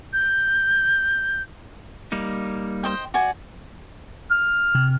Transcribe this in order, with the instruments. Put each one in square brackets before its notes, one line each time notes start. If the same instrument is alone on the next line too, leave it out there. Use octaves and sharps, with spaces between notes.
[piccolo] G6
[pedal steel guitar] G3 A#3 D#4
[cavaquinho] C5 D#5 G5
F#4 D5 G#5
[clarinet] F6
[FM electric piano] C3